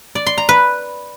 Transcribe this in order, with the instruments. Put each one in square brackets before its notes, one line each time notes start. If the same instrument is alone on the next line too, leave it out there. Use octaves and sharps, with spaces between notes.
[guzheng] D5
C6
A#5
B4